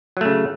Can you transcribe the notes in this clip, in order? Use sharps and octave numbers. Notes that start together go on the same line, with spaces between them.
C#3 F#3 A3